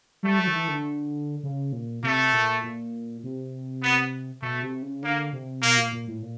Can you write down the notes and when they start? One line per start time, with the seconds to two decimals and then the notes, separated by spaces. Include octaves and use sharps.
0.23 G3 A3
0.38 F#3
0.47 D#3
0.53 E3
0.68 D3
1.43 C#3
1.73 A#2
2.03 C3 A3
2.33 A#2
2.63 A#2
3.23 C3
3.82 B3
4.42 B2 A3
4.62 C3
4.82 C#3
5.02 D3 A#3
5.33 C3
5.62 B2 A#3
5.77 A#2
5.92 A#2
6.07 A2
6.22 A#2